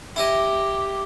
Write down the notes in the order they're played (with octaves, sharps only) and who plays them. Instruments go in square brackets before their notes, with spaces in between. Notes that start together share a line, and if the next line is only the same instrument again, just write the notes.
[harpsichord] E4 D#5 [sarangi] G4